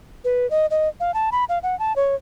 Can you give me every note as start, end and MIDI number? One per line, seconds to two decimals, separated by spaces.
0.24 0.49 71
0.51 0.66 75
0.71 0.88 75
1.00 1.14 77
1.14 1.30 81
1.32 1.45 83
1.49 1.59 77
1.63 1.78 78
1.79 1.95 81
1.96 2.15 73